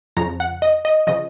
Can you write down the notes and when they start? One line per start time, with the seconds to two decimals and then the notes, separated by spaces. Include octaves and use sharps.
0.17 F2 C#3 F3 A#5
0.40 F#5
0.62 D#5
0.85 D#5
1.07 C#3 F3 D#5